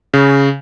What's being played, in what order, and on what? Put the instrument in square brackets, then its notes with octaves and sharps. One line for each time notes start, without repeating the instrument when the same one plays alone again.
[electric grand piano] C#3